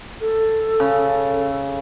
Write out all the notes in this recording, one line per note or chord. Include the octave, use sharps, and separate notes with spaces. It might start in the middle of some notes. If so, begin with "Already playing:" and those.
A4
C#3